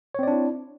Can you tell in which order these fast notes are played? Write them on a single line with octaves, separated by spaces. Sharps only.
C#5 C4 D5 D4 E4